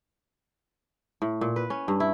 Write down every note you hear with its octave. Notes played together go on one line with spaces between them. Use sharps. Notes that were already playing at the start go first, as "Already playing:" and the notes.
A2
A#2
B4
C#4
G2
E4